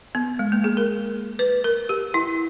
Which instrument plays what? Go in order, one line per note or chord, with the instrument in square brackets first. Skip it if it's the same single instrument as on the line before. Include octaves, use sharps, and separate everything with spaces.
[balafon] B3
G#3
A#3
G#4
A#4
B4
A#4
G4
E4